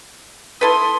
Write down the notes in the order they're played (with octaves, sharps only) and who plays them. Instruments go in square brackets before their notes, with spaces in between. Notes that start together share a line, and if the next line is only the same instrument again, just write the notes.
[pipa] E4 A4 B4 [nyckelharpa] C6 D#6